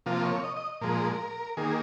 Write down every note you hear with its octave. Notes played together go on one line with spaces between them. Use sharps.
C3 F3 A#3 F4
C#5
D#5
D#5
A#2 F3 G#3 A#4
D#3 A#3 G#4